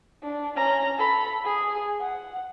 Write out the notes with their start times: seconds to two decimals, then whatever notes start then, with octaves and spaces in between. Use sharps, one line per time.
0.23 D4
0.56 C#4 A#5
0.97 A4 B5
1.45 G#4
2.00 F#5